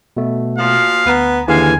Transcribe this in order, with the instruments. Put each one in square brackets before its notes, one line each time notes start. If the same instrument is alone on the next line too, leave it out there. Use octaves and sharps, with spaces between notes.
[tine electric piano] B2 A3
[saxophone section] A#2 F3 F#4 [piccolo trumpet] F5
[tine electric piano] D2 A#5 [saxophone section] B3
[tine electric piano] D#2 D3 E3 [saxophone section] G#3 F5 [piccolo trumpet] G#5